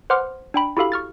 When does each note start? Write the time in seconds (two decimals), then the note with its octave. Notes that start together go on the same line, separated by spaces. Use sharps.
0.10 B4 C5 F#5 C6 D6 F6
0.54 D4 G5 B5
0.77 E4 F#4 G4 A4 F5 B5
0.92 C#6 F6 A6